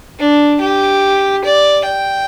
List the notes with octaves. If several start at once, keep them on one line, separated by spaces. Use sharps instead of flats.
D4
G4
D5
G5